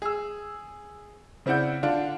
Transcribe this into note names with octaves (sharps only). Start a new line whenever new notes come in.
G#4 E6
C#3 C4 E4 D5 F#5 G6
D3 D4 F4